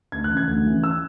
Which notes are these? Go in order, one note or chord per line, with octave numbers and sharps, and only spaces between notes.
D2 G#6
F#6
C#3 E3
G#6
D2
C#3 E3
E6